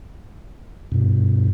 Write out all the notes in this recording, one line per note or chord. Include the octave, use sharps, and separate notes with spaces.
G2 B2